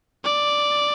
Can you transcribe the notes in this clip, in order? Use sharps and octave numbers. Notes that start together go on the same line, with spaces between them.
D5